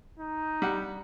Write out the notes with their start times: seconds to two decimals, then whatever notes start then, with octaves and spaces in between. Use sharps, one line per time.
0.19 D#4
0.62 G3 F#5